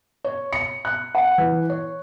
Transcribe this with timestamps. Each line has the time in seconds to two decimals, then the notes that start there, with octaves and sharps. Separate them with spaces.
0.24 C#5
0.53 C#7
0.85 F#6
1.15 F#5
1.38 E3
1.70 C#5